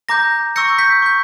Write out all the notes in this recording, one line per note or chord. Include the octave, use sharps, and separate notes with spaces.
A#5 D6 G6 A#6
C#6 E6 G6 A#6 C#7
G6 B6
C#6 G6